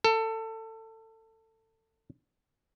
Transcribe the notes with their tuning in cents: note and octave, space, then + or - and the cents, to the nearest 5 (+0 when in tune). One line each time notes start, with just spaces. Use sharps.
A4 +25